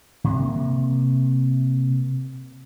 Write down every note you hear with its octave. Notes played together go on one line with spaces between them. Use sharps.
C3 A#3